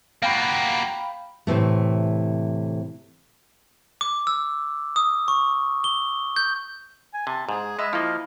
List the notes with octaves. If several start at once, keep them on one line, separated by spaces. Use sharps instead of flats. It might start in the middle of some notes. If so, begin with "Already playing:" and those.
A#3 F#4 F5 G5 B5
A2 C3 E3 A3
D6
E6
D#6
C#6
G7
G6
G#5
C3 A5
G#2 G#4
G#3 D#5 E5 B5 D#6
F3 A#3 E4 F5